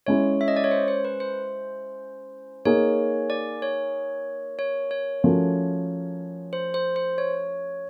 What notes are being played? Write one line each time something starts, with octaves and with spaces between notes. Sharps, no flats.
G#3 C#4 E4 C#5
E5
D#5
D5
C#5
C5
C5
B4
C5
A#3 D#4 G#4 C#5
D5
C#5
C#5
C#5
F3 A3 C#4 F#4 A#4
C5
C5
C5
C#5